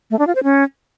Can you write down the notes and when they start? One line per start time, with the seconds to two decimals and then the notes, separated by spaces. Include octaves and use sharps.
0.11 A3
0.19 D4
0.27 F4
0.35 C5
0.43 C#4